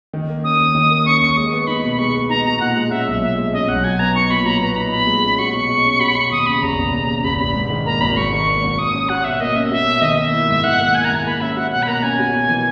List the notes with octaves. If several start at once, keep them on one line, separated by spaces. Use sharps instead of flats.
D#3
A#3
C#4 D#6
D#2
D#3
A#3
C#4 C#6
D#2 C#6
G#3 D#6
B3 C#6
D#4 B5
B2
G#3 C#6
B3
D#4 A#5
B2 A#5
A#2 F#5
G#3
C#4 E5
B1
A#2 E5
G#3
C#4 D#5
B1 F#5
F#3 G#5
B3 A#5
D#4 C#6
A#2 B5
F#3 A#5
B3 A#5
D#4 B5
A#2 B5
G#3
C#4
F#4 C#6
B2 C#6
G#3
C#4
F#4 B5
B2 C#6
D#2 D#6
C#3 B5
E1 A#5
E1
D#2
C#3
E1 B5
E1 B5
G#2
D#3
A#3 A#5
G#1 B5
G#2 C#6
D#3 C#6
A#3
G#1
A#3 D#6
C#4
F#4 F#5
B2 E5
A#3 D#5
C#4 E5
F#4 E5
B2
D#3 D#5
A#3 E5
E4
G#2
D#3 F#5
A#3
E4 G#5
G#2 A#5
G#5
A#3 B5
C#4 E5
F#4 F#5
B2 F#5
B5
A#3 A#5
C#4 G#5
F#4
B2
E3